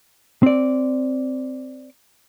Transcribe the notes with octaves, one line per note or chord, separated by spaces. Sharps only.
C4 D5